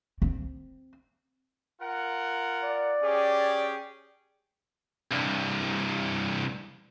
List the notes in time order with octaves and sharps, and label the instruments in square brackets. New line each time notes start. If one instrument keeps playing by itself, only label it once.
[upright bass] C4
[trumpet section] F4 A#4 F#5
[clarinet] D5
[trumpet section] C#4 G4 G#4
[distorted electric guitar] C2 G2